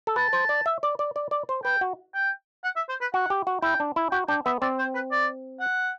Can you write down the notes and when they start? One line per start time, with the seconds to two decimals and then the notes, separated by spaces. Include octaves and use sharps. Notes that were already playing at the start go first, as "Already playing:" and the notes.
0.07 A4
0.16 B4 A5
0.33 C5
0.49 D5
0.66 E5
0.83 D5
0.99 D5
1.16 D5
1.31 D5
1.49 C5
1.64 B4 G5
1.81 F#4
2.15 G5
2.64 F#5
2.76 E5
2.89 C5
3.01 B4
3.14 F#4 F#5
3.30 G4
3.47 F#4
3.62 E4 G5
3.80 D4
3.96 E4
4.12 F#4 G5
4.28 D4 G5
4.46 B3 E5
4.62 C4 D5
4.79 C5
4.94 B4
5.11 D5
5.60 F#5